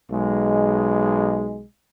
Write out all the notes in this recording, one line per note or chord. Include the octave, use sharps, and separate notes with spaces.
B1 G#3